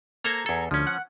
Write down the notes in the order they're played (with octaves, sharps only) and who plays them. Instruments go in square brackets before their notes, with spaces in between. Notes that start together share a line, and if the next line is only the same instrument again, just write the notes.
[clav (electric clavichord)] A#3 A4 C5 [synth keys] A#5 G#6
[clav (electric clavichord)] E2 A4
[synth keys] D2 [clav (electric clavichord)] F3 C#4
[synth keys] F#5